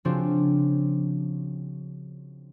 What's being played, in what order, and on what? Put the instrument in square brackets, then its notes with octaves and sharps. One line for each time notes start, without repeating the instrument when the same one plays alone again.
[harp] C#3 F3 C4 D4 F4 F#4